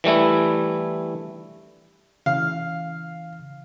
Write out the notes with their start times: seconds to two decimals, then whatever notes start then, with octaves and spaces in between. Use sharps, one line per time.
0.04 E3 G3 A3 E4
2.26 C#3 E3 F5